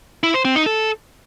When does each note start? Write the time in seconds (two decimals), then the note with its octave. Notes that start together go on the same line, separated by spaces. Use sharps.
0.23 E4
0.34 C5
0.45 C4
0.55 D#4
0.66 A4